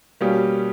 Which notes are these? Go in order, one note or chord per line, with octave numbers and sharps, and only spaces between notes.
B2 G3 A#3 C#4 G4